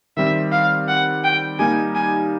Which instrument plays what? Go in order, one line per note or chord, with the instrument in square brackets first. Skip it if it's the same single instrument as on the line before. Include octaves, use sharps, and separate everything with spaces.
[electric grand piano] D#3 G3 C4 [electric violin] E5
[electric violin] F5
F#5
G5
[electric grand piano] G3 A#3 D#4 G4 [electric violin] G#5
[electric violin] G#5